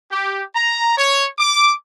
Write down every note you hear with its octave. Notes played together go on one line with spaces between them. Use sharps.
G4
A#5
C#5
D6